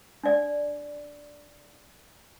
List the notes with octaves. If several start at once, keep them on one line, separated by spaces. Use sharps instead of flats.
D4 D5